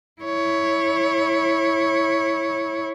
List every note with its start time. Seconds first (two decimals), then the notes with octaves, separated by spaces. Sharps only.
0.21 E4 C#5